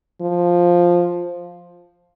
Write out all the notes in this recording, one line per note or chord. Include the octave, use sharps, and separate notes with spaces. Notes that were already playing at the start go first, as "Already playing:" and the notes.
F3